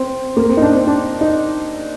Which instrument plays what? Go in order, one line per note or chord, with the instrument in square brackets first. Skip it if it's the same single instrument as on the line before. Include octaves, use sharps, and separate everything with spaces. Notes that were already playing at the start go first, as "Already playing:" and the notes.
Already playing: [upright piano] C4
A#3
C4
D#4
D4
C4
D4
D#4